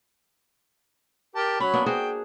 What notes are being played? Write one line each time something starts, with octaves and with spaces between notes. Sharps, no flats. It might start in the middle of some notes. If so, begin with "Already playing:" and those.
G4 A#4 A5
F#3 C#4 C#5 B5
A#3 B3 D4
F#4 G#4 C5 G5